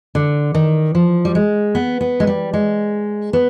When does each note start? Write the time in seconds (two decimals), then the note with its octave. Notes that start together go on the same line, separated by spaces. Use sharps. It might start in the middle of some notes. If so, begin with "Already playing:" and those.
0.15 D3
0.55 D#3
0.95 F3
1.25 G3
1.35 G#3
1.75 B3
2.01 B3
2.20 G#3
2.27 G3
2.53 G#3
3.33 B3